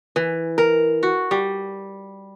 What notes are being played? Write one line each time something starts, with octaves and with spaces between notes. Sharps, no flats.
E3
A#4
F#4
G3